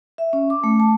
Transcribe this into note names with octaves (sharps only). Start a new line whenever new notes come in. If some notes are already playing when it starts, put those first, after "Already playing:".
E5
C#4
D6
A3
A5